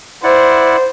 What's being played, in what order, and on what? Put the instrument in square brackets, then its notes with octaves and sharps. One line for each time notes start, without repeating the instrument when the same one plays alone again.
[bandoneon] E4 D5 F#5 [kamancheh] C5